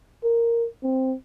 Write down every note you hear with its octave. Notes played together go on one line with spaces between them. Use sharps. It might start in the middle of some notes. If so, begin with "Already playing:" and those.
A#4
C4